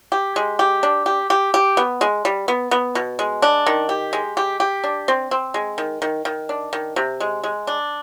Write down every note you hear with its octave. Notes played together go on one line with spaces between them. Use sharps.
G4
G#3
G4
D4
G4
G4
G4
B3
G#3
G3
B3
B3
B2
G#3
D4
D#3
G4
G#3
G4
G4
D4
C4
C4
G#3
D#3
D#3
D#3
D4
D#3
C3
G#3
G#3
D4